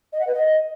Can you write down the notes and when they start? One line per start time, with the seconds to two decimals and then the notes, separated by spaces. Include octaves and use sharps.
0.13 D#5
0.20 F#5
0.27 B4
0.34 D#5